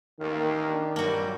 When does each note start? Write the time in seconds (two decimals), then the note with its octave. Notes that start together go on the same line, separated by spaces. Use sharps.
0.20 A1 D#2 D#3 A#3 F5
0.65 D4
0.96 G#1 G2 A#2 F#3 G3 A#3 F#4